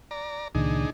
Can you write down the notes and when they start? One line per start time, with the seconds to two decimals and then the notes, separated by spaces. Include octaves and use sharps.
0.11 D5 A#5
0.55 C#2 A#2 D#3 D4 D#4 G#4